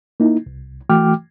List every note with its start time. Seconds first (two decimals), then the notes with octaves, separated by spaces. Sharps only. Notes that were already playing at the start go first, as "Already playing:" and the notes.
0.20 A#3 D#4 E4
0.46 C2
0.89 E3 A3 F#4 G5 D6 F6